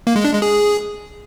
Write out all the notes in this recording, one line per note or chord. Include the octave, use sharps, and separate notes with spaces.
A#3
G#3
D4
G#3
G#4